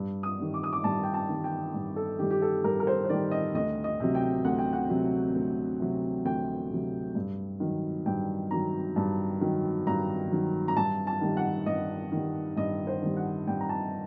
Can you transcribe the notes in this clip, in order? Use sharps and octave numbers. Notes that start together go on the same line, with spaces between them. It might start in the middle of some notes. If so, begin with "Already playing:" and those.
Already playing: G2
D#6
D#3 G3
D6
D#6
D6
G2 A5
G5
A5
D#3 G3
G5
G2
A4
D#3 G3 G4
G4
A4
G2 A#4
A#4
C5
C5
D#3 G3 D5
D#5
D2 D#5
D#5
C3 F#3
G5
D2 F#5
G5
F#5
C3 F#3
D2
C3 F#3
D2 G5
C3 F#3
G2
D#3 F#3
G2 G5
D#3 F#3 A#5
G2 A5
D#3 F#3
G2 A#5
D#3 F#3
A#5
G2 A5
A5
D#3 G3
F#5
G2 D#5
D#3 G3
G2 D#5
C5
D#3 G3
F#5
G2 G5
A#5
A5